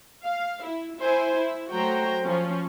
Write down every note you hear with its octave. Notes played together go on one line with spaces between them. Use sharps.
F5
E4
E4 C5 G#5
E4
F#3 A3 F#4 C5 G5 A#5
F3 C#4